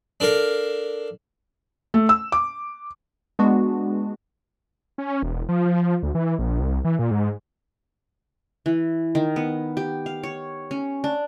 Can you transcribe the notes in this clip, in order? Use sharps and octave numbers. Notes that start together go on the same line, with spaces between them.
D4 A4 A#4 F5
A3
E6
D6
G#3 B3 D4 F#4
C#4
E1
F3
F3
D2
E3
A#1
C2
E3
A#2
G#2
E3
D#3
B3
G4
F5
C#5
C#4
D4